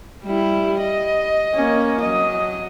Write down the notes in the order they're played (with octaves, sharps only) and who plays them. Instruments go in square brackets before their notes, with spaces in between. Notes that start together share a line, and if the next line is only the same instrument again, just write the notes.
[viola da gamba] G3 E4
D#5
[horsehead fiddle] A#3 C#4
[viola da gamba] F#3 [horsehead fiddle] D#5